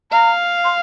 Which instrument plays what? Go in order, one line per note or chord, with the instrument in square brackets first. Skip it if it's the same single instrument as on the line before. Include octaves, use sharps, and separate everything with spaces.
[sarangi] F5 [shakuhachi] A#5
[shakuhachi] C6